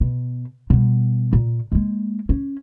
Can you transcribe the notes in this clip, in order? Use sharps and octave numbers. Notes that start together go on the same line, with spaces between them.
B2
B2 G3
A#2
G#3 A#3
C#4